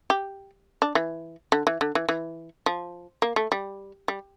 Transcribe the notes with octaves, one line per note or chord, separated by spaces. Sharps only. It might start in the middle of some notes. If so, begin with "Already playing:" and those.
G4
D4
E3
D3
E3
D3
E3
E3
F3
A#3
A3
G3
G3